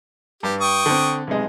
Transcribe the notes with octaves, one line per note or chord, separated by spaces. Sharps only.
G2 G4
G5 C#6 D#6
D3 C4
B1 C3 G#3